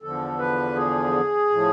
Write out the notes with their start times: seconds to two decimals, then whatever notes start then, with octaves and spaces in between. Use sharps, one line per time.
0.02 E2 D3 F3 A4
0.38 B4
0.76 G#4
1.50 A2 F3